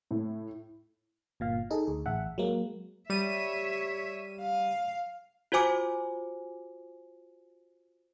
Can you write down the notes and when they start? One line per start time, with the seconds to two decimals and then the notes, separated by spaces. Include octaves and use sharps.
0.11 A2
1.40 G1 A#2 F5
1.71 D#4 G#4 A4
1.87 D2 G#4
2.06 A1 E5 F#5
2.38 F#3 G#3 A#3
3.10 G3 C#5 E5 D#7
4.41 F5
5.52 F4 F#4 C5 G#5 D6